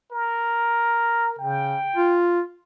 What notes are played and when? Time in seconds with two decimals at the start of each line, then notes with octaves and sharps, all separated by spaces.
0.11 A#4
1.39 C#3 G5
1.96 F4